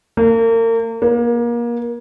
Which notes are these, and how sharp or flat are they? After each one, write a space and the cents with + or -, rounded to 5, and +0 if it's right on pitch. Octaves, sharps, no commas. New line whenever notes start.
A#3 -35
A#3 +30